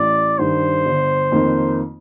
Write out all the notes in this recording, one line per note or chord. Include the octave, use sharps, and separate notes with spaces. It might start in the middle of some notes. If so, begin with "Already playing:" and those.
Already playing: A1 D5
G2 D#3 C5
G1
F2 D#3 A#3 D#4